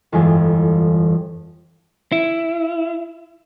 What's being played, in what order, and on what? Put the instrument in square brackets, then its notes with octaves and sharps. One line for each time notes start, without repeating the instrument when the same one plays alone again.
[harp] G1 F2 E3 G#3 F4 G#5
[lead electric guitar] E4